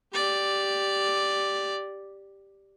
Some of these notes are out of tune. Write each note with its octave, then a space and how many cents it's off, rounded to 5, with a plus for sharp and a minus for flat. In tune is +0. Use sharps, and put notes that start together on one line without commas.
G4 +0 D5 +0